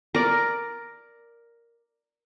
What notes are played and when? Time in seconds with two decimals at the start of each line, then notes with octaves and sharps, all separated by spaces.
0.15 A#4 D5